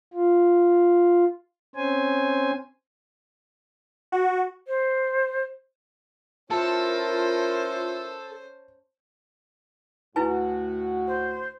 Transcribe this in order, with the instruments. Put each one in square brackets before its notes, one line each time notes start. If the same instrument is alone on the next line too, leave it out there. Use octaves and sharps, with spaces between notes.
[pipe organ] F4
C4 C#4 C5 G#5
[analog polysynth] F#4
[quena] C5
[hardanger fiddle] C#4 C5 [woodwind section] E4 F4 A#4 [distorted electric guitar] A4 [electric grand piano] A5
[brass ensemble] D2 A2 F#4 [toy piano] E4 B4 G#5
[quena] C5